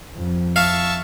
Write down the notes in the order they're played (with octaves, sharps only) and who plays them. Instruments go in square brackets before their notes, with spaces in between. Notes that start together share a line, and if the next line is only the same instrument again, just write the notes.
[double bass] F2
[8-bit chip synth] E5 A5 C#6 [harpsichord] F5